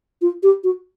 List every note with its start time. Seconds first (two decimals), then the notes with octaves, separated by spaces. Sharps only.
0.22 F4
0.43 G4
0.64 F#4